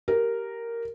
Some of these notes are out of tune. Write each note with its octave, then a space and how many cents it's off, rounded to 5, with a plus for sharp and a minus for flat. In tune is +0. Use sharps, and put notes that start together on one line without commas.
G4 -10 A#4 -5